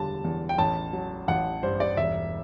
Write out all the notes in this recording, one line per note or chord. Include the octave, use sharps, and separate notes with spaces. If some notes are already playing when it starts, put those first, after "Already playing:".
Already playing: E1 D3 G3 A5
E2
G5
A1 A5
F#3
A1 F#5
G2 C5
D5
E1 E5